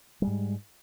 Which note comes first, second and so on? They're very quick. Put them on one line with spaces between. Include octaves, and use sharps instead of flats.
G3 G#3 G#2